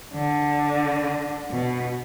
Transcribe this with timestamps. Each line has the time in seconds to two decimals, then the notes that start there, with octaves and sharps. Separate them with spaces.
0.14 D3
1.51 B2